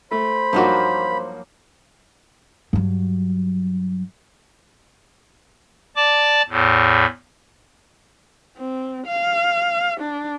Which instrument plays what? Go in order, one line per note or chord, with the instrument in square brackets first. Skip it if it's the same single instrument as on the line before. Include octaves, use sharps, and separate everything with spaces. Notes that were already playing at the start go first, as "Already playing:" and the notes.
[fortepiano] A3 [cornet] C5 [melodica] B5
[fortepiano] G2 D#4 F#4 [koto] F3 F#3 A#3
[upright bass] G2 F#3
[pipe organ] D5 A5 D6
E2 A2
[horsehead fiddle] C4
F5
D4